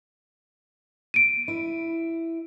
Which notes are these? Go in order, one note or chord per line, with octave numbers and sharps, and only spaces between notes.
D7 D#7
E4